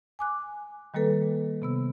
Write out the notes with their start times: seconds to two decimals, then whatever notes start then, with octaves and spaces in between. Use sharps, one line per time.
0.19 G#5 D6 F#6
0.94 D#3 G3 A#3 A4 B4
1.62 C3 B3 E6